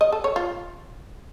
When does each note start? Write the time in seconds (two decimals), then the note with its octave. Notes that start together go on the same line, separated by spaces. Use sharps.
0.01 D#5
0.12 A4
0.24 C#5
0.36 F4